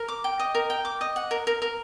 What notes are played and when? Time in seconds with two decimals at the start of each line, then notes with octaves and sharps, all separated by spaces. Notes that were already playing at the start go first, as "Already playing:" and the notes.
Already playing: A#4
0.08 D6
0.24 G5
0.40 D#5
0.55 A#4
0.70 G5
0.85 D6
1.01 D#5
1.16 F#5
1.31 A#4
1.47 A#4
1.62 A#4